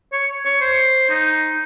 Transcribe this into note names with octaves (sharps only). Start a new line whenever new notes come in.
C#5
C#5
C5
D#4